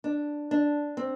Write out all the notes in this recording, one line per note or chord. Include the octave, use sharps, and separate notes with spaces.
D4
D4
C4